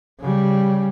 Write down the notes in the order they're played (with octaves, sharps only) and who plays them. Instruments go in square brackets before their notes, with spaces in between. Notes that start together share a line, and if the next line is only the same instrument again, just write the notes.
[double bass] C#3 G3